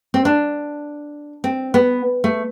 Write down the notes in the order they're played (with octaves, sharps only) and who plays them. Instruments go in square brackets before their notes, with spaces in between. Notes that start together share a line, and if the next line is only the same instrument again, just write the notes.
[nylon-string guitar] C4
D4
C4
B3
A3